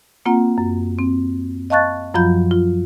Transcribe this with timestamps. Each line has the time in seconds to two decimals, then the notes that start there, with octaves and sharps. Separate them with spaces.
0.26 A#3 C4 F4 F#5 A#5
0.58 F#2
0.99 C4
1.70 D#5 F5 A5 C#6 F#6 A6
2.14 F#2 F3 F#3 F4 B5 G6
2.51 F4